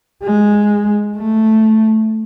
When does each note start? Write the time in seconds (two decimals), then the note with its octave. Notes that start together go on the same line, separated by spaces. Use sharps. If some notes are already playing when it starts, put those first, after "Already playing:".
0.23 G#3
1.16 A3